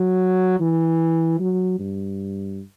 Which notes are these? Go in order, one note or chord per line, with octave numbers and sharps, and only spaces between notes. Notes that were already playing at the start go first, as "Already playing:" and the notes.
Already playing: F#3
E3
F#3
G2